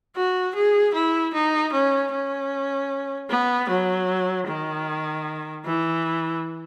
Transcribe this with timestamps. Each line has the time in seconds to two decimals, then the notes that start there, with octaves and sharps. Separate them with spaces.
0.16 F#4
0.55 G#4
0.94 E4
1.34 D#4
1.73 C#4
2.12 C#4
3.30 B3
3.69 F#3
4.48 D#3
5.66 E3